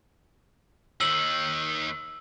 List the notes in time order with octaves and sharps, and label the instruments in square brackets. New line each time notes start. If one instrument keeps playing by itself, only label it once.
[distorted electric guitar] D#2 D#3 [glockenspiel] E6 F#7